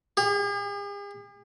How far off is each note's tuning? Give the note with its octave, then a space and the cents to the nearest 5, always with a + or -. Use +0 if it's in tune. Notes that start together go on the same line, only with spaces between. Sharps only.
G#4 -45